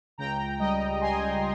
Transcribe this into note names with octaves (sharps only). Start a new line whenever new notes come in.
C#2 G5 A#5
G3 D#5 G5
G3 G#5 C6